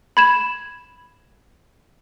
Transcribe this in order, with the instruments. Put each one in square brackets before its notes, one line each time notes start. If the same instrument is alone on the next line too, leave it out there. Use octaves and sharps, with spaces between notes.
[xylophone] B5 G#6 E7